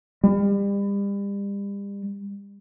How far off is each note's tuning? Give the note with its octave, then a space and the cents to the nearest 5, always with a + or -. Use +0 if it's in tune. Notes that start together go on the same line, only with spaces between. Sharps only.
G3 +35